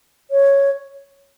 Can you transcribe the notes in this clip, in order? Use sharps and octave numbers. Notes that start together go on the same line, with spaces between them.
C#5